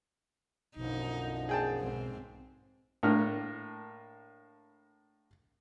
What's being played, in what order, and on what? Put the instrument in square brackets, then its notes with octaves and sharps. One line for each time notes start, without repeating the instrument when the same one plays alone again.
[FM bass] B1 [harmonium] F#2 D3 F3 [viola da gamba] D#4
[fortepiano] G#4 G5 A5
[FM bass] B1 [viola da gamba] G#2 C4
[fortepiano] A2 A#3 D4 F6